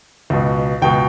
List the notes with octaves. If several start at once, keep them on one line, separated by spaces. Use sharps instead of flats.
C#2 B2
C#2 B2 G5